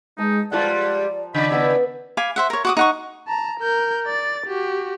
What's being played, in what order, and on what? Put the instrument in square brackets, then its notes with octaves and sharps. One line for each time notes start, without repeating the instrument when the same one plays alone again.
[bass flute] G#3 [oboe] D#4 [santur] A5
[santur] F3 A#4 G5 [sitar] G3 G#3 F4 [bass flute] D5 [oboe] F#5
[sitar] C#3 D5 [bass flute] D#5 [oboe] B5
[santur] B3 B4 B5 [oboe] E4
[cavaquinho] F5 G#5 B5 D6
C5 E5 F#5
A#4 C#5
F#4 D6 D#6
D#4 F#5 C#6
[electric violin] A5 A#5
A#4 G6
D5 A6
F#4 G4